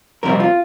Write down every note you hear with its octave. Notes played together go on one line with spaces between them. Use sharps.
F2 C3 G3 C4 A#4
F4